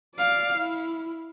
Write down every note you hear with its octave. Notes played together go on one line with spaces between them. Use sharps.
D5 F5
E4